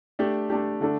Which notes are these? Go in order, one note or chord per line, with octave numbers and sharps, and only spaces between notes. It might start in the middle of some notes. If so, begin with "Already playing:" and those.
A3 D4 G4
A3 D4 G4
D3 A3 D4 A4